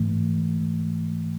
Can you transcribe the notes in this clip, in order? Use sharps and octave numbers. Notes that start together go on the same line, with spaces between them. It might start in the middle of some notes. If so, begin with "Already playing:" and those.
Already playing: G#2 E3 A3